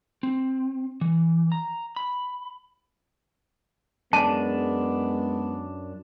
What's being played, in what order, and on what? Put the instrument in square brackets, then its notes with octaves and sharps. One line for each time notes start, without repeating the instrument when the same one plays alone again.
[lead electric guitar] C4
E3
A#5
B5
[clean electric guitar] F#2 D4 [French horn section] G#3 [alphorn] B3 [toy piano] A5